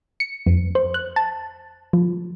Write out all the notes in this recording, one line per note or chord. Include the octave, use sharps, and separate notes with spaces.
C#7
F2
C5
F#6
A5
F3